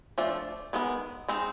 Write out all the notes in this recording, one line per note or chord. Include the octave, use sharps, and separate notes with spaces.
F3 A3 D4
D#3 G#3 B3
G#3 C4 D#4